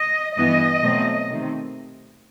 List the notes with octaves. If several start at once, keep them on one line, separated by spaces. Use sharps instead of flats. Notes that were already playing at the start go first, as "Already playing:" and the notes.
Already playing: D#5
G2 E3 B3 D#5
B2 F#3 A3 C4
C3 D#3 A3 C4